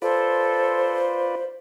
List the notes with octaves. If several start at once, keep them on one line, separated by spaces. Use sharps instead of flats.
F4 A4 B4 C5 D5